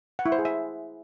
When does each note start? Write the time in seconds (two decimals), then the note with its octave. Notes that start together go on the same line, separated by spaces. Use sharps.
0.19 F#5
0.26 E4
0.32 C5
0.39 G#4
0.45 E5